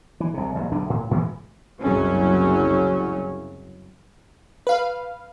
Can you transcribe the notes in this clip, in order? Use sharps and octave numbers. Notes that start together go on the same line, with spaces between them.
E3
C2 C3
F1 A#1
F#1 B1 D3 D4
A2
G#2 E3 G#3
F#1 C2 F#2 C#3 F#3 C#4
B4 F5